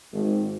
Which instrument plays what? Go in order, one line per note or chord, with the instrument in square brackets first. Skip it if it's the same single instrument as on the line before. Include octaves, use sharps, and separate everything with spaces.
[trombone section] G#1